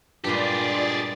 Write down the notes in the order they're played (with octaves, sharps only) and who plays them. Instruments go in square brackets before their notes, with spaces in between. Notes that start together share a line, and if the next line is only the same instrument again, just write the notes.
[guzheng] G2 A#2 G#3 [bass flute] F4 [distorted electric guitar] G4 G#4 [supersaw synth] D5 A6